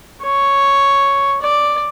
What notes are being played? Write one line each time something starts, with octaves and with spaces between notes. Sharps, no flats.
C#5
D5